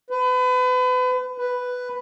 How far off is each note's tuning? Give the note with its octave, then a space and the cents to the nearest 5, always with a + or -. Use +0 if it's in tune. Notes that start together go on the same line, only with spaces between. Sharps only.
B4 +35
B4 +5